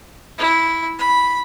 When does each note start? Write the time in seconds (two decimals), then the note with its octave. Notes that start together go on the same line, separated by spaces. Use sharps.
0.38 E4
0.99 B5